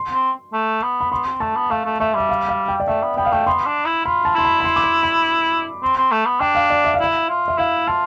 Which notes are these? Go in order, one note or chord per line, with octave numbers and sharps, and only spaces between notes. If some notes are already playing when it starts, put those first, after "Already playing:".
Already playing: C6
C4
A3
B3
B5
B3 C6
C4
A3 A5
B3
A3 F5
A3
A3 E5
G3 E5
F5
F5
G5
D5
A3 E5
B3
B3 G5
F5
A3 G5
B3 C6
D4
E4
F4 B5
A5
E4 C6
B5
B5
C6
D6
C6
B5
C4
C4
A3
B3
D4 G5
F5
D5
E5
F5
E4 E5
F4
E5
E4 F5
F4 A5